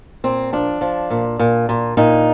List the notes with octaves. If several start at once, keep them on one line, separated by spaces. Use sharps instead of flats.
A#2 C4
F3 D4
F3
A#2
A#2
A#2
A#2 D#4